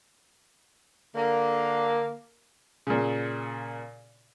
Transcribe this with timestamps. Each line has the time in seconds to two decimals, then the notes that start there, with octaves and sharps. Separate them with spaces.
1.16 D3 A#3
2.87 A#2 C#3